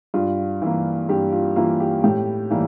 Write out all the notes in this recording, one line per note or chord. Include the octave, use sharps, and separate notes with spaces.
G2 F4
E3 A#3
G2 G4
F4
E3 A#3 F4
G4
A2 G4
E3 G3 A#3